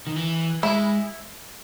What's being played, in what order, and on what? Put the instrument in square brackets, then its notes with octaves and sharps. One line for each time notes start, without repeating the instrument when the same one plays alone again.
[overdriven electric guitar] D#3
E3
[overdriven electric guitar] G#3 [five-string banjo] E4